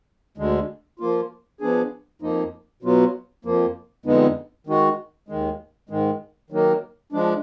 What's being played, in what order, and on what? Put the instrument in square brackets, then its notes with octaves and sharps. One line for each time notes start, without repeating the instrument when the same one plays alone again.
[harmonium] D2 D3 G#3
F3 A#3 F4
F3 B3 D4 G#4
F2 F3 A#3 D#4
B2 F#3 B3 F4
F2 F3 A#3
F2 D3 G#3 B3 D#4
D#3 G#3 D#4 F#4
D#2 D#3 G#3
G#2 D#3 G#3
D#3 F#3 A#3 D#4 A#4
F3 G#3 D4